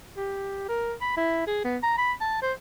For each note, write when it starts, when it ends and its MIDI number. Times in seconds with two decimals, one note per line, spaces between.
0.16 0.68 67
0.68 0.93 70
1.01 1.13 83
1.17 1.42 64
1.47 1.63 68
1.64 1.77 59
1.83 1.96 82
1.98 2.12 83
2.21 2.42 81
2.42 2.53 72